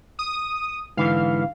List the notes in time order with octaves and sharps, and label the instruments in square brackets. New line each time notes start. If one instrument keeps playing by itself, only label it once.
[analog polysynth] D#6
[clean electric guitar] G#2 D3 E3 [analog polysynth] F5